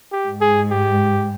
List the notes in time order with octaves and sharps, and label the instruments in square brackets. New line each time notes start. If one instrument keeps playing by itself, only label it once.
[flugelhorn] G4
[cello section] G#2
[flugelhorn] G#4
G4